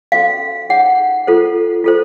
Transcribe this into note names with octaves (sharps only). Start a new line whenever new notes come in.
C#4 F#4 A4 C5 F5
D#4 G#4 C#5 F#5
F4 A4 C5
F4 A4 C5